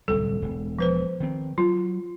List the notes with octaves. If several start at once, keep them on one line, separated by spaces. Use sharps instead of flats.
D1 C2 F#3 A4
E1
F3 B4 C5
D#3 C4
F#3 F4